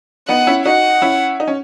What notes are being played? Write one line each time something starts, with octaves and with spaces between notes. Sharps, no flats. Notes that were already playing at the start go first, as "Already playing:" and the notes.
B3 D#4 F#5
C#4 E4
D#4 F#4 F#5
C#4 E4
D#4
C#4